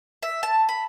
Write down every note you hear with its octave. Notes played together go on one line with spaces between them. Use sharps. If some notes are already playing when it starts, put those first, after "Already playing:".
E5
A5
B5